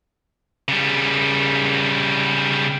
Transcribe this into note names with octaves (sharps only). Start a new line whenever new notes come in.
C#3 G3